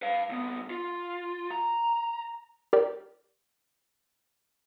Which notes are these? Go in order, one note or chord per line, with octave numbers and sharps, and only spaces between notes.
B4 F5
C2 B3
F4
A#5
G4 A#4 D5 G5